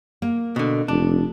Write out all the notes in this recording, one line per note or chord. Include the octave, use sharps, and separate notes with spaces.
A#3
B2 D3
F1 D4